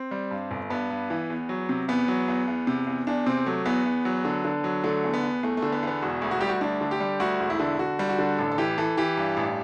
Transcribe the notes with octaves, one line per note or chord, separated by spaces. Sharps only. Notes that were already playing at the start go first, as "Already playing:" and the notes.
Already playing: C4
G3
G2
G1
G2 B3
G2
E3
E2
F#3
C3
E2 B3
F#3
E2
E2
C3
E2
E2 D4
C3 C4
F#3 A3
E2 B3
E2
F#3
D3
D3
F#3
D3 A3
E2
B3
E2
E2 A3
A3
D3
B3
E2 B3
E1 F#4
D2
F#4
G3 G4
F#4
D2 D4
D3
G4
G3
D2 F#4
E1
E4
D3
D3 F#4
G3
F#4
D3
A1 A4
A4
E3 G4
E3 A4
E3 G4
G2
A1